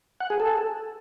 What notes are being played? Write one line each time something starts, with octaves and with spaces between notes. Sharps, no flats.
F#5
G#4
A4